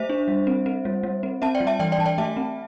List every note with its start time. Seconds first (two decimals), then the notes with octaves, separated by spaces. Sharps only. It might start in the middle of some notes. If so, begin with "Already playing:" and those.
Already playing: A3 C5 E5
0.09 D4
0.28 G3
0.47 C4
0.66 C4
0.85 G3
1.03 G3
1.23 C4
1.42 C4 E5 A5
1.55 D5 G5
1.60 G3
1.67 E5 A5
1.79 E3 D5 G5
1.92 D5 G5
1.98 E3 A5
2.06 D5 G5
2.18 A3 E5 A5
2.37 C4